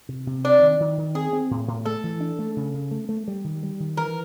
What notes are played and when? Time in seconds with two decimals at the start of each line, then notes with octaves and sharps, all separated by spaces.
0.09 C3
0.27 C3
0.45 C4 D4
0.61 D#3
0.80 D#3
0.97 D#3
1.15 C4 G#4
1.33 C4
1.51 A2
1.68 A2
1.86 A3 A4
2.04 E3
2.20 D4
2.39 A3
2.56 C#3
2.74 C#3
2.91 A3
3.09 A3
3.28 G3
3.44 D#3
3.63 G3
3.80 D#3
3.97 E3 A#4